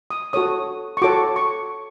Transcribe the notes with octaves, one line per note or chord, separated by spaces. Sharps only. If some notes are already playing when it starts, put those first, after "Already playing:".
D#6
F#4 A4 C#5 D#6
C#6
F#4 A4 C#5 D6
C#6